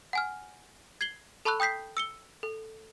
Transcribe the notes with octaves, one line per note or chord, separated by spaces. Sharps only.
F#5 G#5 F6
G#6 C7 F#7 G7
A4 A5 B5 C#6 E6 F#6
G5 D#6 G6 B6 C7
E6 C#7 G7
A4